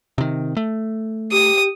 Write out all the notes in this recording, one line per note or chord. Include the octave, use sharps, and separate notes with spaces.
C3 D#3
A3
G4 D#6